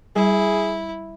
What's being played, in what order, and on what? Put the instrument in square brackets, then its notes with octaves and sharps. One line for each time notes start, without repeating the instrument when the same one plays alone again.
[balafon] G3 [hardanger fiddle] E4 [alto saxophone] G#4